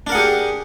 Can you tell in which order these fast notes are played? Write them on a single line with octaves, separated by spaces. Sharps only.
D4 A#4 F#5 G#4 G4